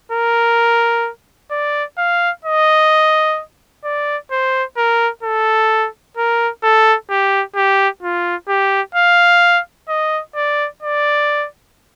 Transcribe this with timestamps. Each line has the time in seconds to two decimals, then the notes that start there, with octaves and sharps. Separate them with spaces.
0.12 A#4
1.51 D5
1.98 F5
2.45 D#5
3.85 D5
4.31 C5
4.77 A#4
5.23 A4
6.17 A#4
6.63 A4
7.10 G4
7.56 G4
8.03 F4
8.49 G4
8.95 F5
9.89 D#5
10.35 D5
10.82 D5